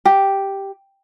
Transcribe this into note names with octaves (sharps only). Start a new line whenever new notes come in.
G4